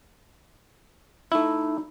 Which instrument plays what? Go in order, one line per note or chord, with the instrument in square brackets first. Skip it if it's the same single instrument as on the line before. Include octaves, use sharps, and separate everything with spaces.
[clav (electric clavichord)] A3 E4 [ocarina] D#4